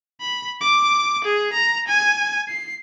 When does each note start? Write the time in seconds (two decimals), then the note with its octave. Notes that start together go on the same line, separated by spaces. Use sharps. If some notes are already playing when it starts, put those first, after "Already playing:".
0.21 B5
0.61 D6
1.25 G#4
1.54 A#5
1.88 G#5
2.49 C7